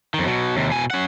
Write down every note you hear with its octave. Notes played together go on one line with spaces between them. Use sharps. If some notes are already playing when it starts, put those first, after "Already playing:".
F2 D#3
B2 F#3
D#2 C3
B2 G#5
C#4 F#5